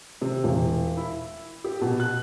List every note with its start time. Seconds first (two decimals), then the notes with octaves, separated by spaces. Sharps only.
0.22 C3
0.44 E1
0.97 E4
1.64 G4
1.81 B2
2.00 F#6